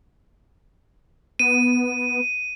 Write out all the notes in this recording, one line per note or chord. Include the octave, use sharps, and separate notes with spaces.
B3 D#7